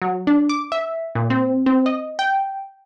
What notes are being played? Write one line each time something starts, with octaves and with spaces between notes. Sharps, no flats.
F#3
D4
D6
E5
A#2
C4
C4
D#5
G5